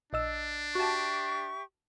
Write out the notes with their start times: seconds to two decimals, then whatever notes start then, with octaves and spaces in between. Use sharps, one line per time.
0.13 A#1 D4 D#5 E6
0.75 F#4 G4 E5 A5 C#6